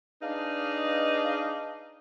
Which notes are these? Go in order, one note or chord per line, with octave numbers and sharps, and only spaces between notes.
D4 D#4 G#4 B4 D#5 F5